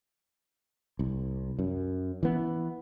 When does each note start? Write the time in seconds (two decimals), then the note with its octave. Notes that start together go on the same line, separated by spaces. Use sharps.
0.99 C2
1.59 F#2
2.23 E3 B3